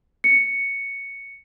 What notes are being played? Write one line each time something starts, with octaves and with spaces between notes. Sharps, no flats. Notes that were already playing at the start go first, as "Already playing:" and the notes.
C#7